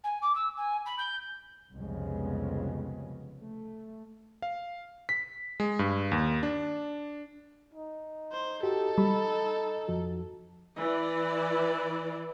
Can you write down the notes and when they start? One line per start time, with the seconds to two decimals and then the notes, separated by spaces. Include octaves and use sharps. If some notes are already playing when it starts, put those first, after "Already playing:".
0.03 G#5
0.22 D6
0.34 E6
0.56 G#5
0.85 B5
0.98 G6
1.73 C2 F2 C#3 G#3 B3
3.39 A3
4.42 F5
5.09 B6
5.60 G#3
5.79 G2
6.12 D#2
6.43 D4
7.74 D#4
8.32 C5
8.63 F#4 G4 A4
8.98 G3 B5
9.88 F2 F3 F#4
10.78 E3 D5